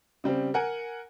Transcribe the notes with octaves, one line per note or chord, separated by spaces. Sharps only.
C#3 G3 C4
A#4 F#5 G#5